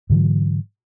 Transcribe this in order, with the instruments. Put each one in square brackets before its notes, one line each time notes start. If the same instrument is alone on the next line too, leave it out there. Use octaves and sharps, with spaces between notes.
[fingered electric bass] G#2 D3 E3 F#3